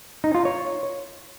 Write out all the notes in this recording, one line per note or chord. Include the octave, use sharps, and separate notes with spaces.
D#4
F4
C#5